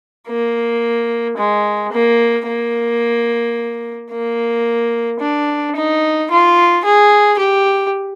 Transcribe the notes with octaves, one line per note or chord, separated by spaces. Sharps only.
A#3
G#3
A#3
A#3
A#3
D4
D#4
F4
G#4
G4